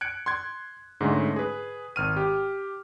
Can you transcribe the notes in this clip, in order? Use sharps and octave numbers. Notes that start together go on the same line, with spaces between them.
F#6 G#6 C#7 D7
C6 F#6 G#6
G#2 D3 G#3 A3 C#4
G#4 B4
G#1 F6 D#7
G4